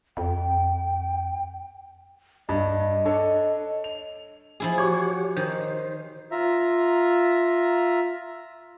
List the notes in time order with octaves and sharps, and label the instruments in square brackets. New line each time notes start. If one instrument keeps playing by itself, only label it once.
[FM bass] F2 [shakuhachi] G5
[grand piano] G2 [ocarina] D#5
[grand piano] D4 A4 C#5
F7
[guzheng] F3 E4 G#4
[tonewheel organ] F#4 G4 C#5
[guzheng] D#3 [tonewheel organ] C5
[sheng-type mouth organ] F4 E5 A#5